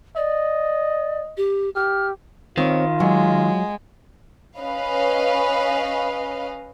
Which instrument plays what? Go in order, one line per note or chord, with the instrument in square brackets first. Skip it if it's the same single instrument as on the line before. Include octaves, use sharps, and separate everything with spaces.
[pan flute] D5 [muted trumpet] D#5
[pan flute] G4
[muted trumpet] G4 [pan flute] F6
[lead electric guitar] D#3 [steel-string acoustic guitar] C4 C#5 [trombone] F4
[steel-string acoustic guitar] F#3 [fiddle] G#3
[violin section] C#4 B4 D#5 F5